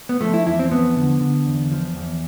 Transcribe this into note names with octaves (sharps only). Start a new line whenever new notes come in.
B3
F3 A3
E4
E2 E4
C4
F3 B3
D3
D3
E2
F3
E2